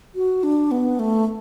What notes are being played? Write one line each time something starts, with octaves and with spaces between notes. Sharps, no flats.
F#4
D4
B3
A3